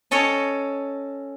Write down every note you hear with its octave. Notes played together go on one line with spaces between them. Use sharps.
C#4 A4 C#5 D#5 A5